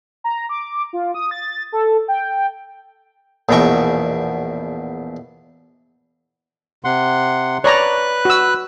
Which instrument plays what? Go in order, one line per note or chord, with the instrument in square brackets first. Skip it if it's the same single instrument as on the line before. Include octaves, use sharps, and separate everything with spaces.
[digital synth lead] A#5
D6
F4
D#6
A6
A4
G5
[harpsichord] A#1 E2 B2 D#5 G5 C#6
[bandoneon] C3 F#5 C6
[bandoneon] B4 F#6 [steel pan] C#5 D5 A#5
[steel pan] F#4 E6